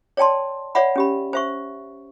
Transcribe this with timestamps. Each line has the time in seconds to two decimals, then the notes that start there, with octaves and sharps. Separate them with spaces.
0.17 C#5 D5 G5 A5 C6
0.75 C#5 D5 E5 F#5 B5
0.96 C#4 G4 B5
1.33 C5 E5 C#6